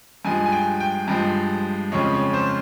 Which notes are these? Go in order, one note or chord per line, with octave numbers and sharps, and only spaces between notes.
G2 F3 G#3 G#5
G#5
G5
G5
G2 F3 G#3
F2 C#3 F3 G#3 C#5
C#5
C5